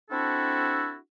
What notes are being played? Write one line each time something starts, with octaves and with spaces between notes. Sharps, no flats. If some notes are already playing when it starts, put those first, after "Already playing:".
C4 D4 E4 F#4 A4